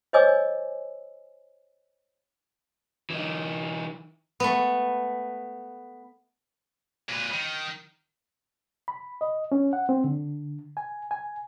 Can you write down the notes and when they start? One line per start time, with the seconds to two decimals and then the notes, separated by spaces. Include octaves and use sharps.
0.13 C5 C#5 D#5 G#5 D6 E6
3.10 E3 D#4
4.40 A3 B3
7.09 A#2 B4
7.33 D#3
8.88 B5
9.21 D#5
9.52 C#4
9.73 F#5
9.89 C4
10.04 D3
10.77 G#5
11.11 G#5